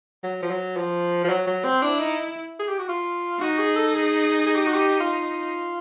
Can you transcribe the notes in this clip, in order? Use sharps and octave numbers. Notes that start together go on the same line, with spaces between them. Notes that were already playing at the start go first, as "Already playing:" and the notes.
F#3
F3
F#3
F3
F3
F#3
F#3
C4
D4 E4
D#4
G#4
G4
F#4
F4
D#4 F#4
G#4
A4
G#4
G#4
G4
F#4
G4
F4